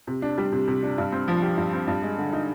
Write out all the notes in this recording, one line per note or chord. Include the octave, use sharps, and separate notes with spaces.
C3
D4
G3
C3
C3
D4
G2
C4
F3
G4
G2
C4
G2
G#3
D3
D#4